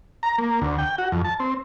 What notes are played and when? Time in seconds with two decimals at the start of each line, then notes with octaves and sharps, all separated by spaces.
0.23 A#5
0.38 A#3
0.61 D2
0.78 G5
0.98 F#4
1.12 F2
1.24 A5
1.40 C4